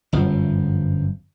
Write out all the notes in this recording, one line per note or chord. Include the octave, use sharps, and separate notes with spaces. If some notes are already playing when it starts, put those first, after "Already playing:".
G1 F#2 F3